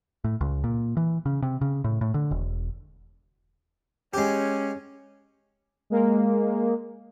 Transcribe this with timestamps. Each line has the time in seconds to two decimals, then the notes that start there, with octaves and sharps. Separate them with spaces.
0.24 A2
0.41 C#2
0.64 A#2
0.97 E3
1.26 C#3
1.42 C3
1.61 C#3
1.84 A2
2.01 A2
2.14 D3
2.31 E1
4.14 G#3 C#4 G4
5.90 G#3 A#3